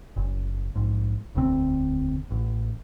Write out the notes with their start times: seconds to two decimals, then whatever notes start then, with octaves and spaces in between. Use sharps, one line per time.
0.16 F#1
0.75 A#1 G#2
1.35 E1 D2 D3 C4
2.31 A1